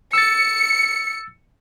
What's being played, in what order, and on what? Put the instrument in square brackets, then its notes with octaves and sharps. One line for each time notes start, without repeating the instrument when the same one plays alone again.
[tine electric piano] E6 A6 [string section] C#7